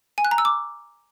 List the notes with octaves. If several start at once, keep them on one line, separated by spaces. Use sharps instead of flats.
G#5
F#6
A#5
E6
D6